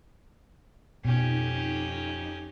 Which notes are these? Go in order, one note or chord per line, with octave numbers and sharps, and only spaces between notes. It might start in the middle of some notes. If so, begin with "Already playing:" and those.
F2 B2 C#4 D#4 G4